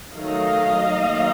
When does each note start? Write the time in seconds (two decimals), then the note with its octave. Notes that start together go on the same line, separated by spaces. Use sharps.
0.14 D#3 F#3 A3 D#5 F5
0.94 D#3 F#3 A#3